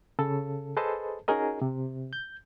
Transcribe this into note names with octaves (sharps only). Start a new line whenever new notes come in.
C#3 A4
G#4 A4 B4 C5 D#5 A5
C#4 D#4 F#4 G#4 A#4 D#5
C3
G6